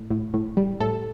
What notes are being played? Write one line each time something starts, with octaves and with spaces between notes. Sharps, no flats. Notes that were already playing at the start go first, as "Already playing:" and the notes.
Already playing: A2
A2
A2
G3
A2 A4